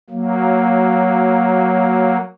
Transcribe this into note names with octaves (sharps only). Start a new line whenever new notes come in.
F#3 A#3